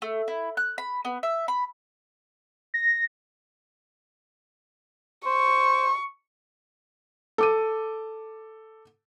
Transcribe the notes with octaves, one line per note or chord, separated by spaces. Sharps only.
A3
E4
F#6
B5
B3
E5
B5
A#6
C5 C#6
A4 D6 D#7